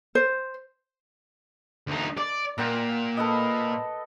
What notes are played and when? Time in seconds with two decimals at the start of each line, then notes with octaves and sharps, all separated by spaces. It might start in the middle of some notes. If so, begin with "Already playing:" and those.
0.15 C5
1.87 D2 D#4
2.17 D5 D6
2.58 A#2 A#4 F#5 G5
3.17 A4 B4 D#5